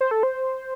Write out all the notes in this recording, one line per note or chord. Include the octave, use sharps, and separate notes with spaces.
C5
A4
C5